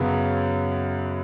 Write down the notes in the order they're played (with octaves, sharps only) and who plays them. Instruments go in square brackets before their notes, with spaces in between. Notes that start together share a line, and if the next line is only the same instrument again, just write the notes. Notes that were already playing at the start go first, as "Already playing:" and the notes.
Already playing: [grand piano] F#2 C#3 F#3 B3